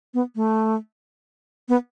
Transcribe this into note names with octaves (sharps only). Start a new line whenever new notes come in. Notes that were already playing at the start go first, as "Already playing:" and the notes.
B3
A3
B3